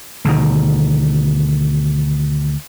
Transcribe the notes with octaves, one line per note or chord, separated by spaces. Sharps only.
D2 B2 D#3